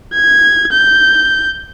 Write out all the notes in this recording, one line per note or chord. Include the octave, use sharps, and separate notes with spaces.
G#6
G6